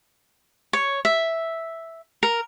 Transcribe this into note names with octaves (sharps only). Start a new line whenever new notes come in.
C#5
E5
A#4